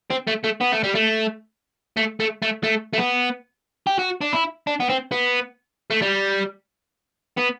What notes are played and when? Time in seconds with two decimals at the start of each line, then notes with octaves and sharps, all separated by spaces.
0.11 C4
0.28 A3
0.44 A3
0.61 B3
0.72 A3
0.84 G3
0.95 A3
1.97 A3
2.20 A3
2.42 A3
2.64 A3
2.93 A3
2.98 B3
3.87 G4
3.99 F#4
4.21 D4
4.33 E4
4.67 D4
4.80 B3
4.89 C4
5.12 B3
5.91 A3
6.02 G3
7.37 B3